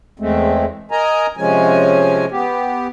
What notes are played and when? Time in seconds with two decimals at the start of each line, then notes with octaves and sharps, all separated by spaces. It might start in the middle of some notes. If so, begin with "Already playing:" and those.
0.20 E2 G#3 A3 C4
0.91 A#4 D#5 G#5 A#5
1.37 C3 F3 G#3 C#4 G#5
2.31 B3 G4